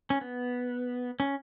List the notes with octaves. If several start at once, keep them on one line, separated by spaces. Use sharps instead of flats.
C#4
B3
C#4